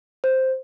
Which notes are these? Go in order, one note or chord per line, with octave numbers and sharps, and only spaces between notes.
C5